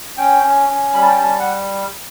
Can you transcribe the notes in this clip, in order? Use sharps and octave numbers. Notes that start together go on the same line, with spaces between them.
C#4 G5
C#4
C#4
G3 B5
A5
G5
G3 A5
F#5